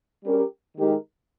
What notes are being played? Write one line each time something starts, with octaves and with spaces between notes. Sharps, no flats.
G3 C#4 G4 A#4
D#3 G#3 D#4 G4 A#4